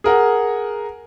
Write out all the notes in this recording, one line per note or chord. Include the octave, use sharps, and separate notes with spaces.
G#4 A#4 F#5